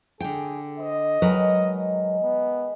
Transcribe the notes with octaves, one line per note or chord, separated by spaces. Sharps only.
D3 G#4 G5
C5 D#5
D#3 F#3 G#3 D#4 A#4 B4
B3